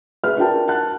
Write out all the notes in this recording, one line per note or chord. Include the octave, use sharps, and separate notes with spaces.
G#4 B4 E5 F6
D4 F4 F#4 A#4 G5 A5
F#5 A5 F#6